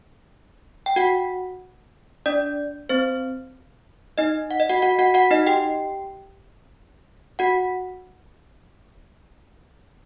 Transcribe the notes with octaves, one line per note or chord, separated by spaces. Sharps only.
G5
F#4 F#5
D4 D5
C4 C5
D#4 D#5
F#5
D#5
F#4 F#5
F#4 F#5
F#4 F#5
F#4 F#5
D#4 D#5
G4 G5
F#4 F#5